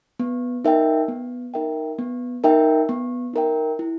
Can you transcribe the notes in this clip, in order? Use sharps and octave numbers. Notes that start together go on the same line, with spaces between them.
B3
D#4 A#4 E5 G5
B3
D#4 A#4 E5 G5
B3
D#4 A#4 E5 G5
B3
D#4 A#4 E5 G5
E4